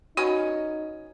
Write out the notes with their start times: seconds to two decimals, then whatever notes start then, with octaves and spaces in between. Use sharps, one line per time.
0.17 B3 C#4 D#4 F#4 D#5